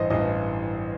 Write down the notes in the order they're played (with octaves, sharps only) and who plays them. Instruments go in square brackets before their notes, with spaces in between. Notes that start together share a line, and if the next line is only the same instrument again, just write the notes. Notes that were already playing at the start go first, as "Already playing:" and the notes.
Already playing: [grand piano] A1 G2 E3 [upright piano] C5 D#5
[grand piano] A1 G2 E3 [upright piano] D#5